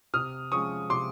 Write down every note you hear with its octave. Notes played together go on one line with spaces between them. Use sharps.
C3 D#6 F6
F3 G#3 C#4 C#6 D#6
C3 C6 D6